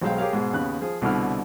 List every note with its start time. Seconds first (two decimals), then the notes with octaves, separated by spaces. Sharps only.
0.02 B1 F#3 G#3 C5 F5 G5
0.18 G4 G#4 A#4 C#5 F5
0.33 G#2 B2 G#4
0.53 D#2 C#3 B3 F#6
0.81 F3 G#4
1.02 C2 B2 D3 E4 F6